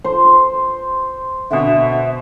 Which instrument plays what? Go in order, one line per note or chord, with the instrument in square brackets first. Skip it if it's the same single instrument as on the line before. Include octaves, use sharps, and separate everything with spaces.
[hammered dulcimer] C5
[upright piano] B2 D3 [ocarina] E5